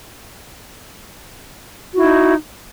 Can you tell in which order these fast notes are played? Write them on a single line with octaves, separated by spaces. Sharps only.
F#4 E4 D#4